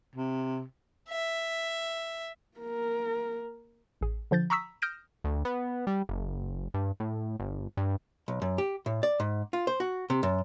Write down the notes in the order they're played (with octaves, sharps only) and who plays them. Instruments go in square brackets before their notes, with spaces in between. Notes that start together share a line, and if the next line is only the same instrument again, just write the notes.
[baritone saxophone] C3
[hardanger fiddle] E5
[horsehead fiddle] A#3 A#4
[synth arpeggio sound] A1 G#4
D3 F3 G6 A6
A#5 B5 C#6 D#6 E6 B6
D#6 F6 G6 A#6 D7 E7
[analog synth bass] D2
B3
G3
F#1
G2
A2
G1
G2
[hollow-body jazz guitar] B1
F#2
G4
A2
D5
G#2
F4
C5
F#4
C3
F#2